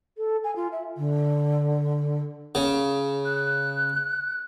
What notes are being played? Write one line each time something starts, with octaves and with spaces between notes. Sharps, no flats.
A4
G#5
F4
E5
D3
C#3
F#6